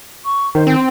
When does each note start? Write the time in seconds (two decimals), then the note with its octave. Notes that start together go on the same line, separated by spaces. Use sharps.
0.25 C#6
0.55 D#3 C5
0.67 C4 G5